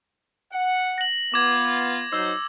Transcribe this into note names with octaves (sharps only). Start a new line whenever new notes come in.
F#5
A#6 F#7
B3 F4 D6 G#6
F#3 D#4 C5 E6